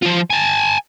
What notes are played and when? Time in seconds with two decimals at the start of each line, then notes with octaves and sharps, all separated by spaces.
0.02 F3 F4
0.30 G#5 A5